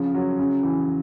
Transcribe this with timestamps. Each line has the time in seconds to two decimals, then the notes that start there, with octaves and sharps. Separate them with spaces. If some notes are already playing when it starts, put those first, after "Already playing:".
Already playing: C#3 F3
0.14 F#3
0.39 C#3
0.63 E3